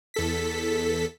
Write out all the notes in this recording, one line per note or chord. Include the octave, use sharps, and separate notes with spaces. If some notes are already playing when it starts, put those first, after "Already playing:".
E2 A4 B6